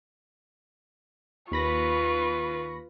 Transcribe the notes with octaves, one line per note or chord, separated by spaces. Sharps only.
D#2 F4 B4 B5 C#6 A#6